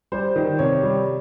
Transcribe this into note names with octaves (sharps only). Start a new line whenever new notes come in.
G3 C5
D#3
C3 C#5
G3